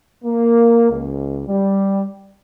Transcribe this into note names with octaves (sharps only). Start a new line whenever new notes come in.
A#3
C#2
G3